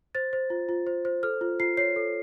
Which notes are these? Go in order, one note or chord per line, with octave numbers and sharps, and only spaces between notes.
C5 A6
C5
F4
F4
C5
C5
A4 F6
F4
F4 C7
C#5 C7
A4